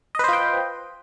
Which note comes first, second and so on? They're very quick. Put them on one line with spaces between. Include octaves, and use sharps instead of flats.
D#5 B4 C5 F4 G5